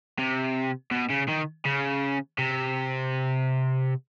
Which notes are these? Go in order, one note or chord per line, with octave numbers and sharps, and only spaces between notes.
C3
B2
C#3
D#3
C#3
C3